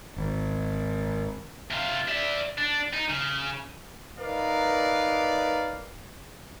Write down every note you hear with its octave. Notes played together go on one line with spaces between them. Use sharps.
G#1
C3 F4
D5 E5
D4
D#4
C#3
D#4 A#4 B4 D5 F5